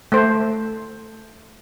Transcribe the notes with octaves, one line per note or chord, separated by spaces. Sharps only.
A3 C5